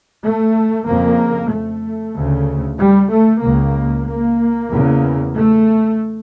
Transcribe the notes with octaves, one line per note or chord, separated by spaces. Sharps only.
A3
F2 C#3 A#3
A3
D2 C#3
G3
A3
C#2 C#3 A#3
A#3
E2 C#3
A3